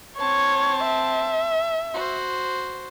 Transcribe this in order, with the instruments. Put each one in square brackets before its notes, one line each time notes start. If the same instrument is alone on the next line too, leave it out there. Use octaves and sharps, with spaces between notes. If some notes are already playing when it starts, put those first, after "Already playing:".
[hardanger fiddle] C4 A5 [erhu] C#5
[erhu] E5
[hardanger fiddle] F#4 C5